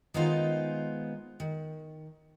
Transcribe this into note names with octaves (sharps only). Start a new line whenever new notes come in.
D#3 G#3 B3 D#4 F4 C5
D#3